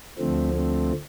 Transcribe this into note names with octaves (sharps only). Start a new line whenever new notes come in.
D2 D3 F3 A3 C4
A3 C4